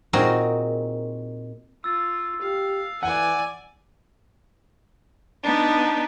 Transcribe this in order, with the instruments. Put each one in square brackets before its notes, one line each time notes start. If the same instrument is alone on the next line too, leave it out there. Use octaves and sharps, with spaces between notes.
[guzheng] A#2 C4 D#4 F#4 G#4 A#4
[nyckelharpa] F4 [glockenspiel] E6 A6
[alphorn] G4 [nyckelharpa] F5
[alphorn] E3 [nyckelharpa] D5 G#5 [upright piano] F#5
[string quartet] B3 D4 D#4